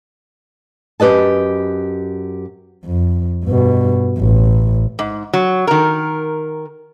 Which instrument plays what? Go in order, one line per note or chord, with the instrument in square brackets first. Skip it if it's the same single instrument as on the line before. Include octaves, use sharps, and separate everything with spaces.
[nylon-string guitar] F#2 G4 B4 D#5 A5
[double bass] F2
G2 B2
A1
[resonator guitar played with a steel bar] G#2
F#3
D#3 A#4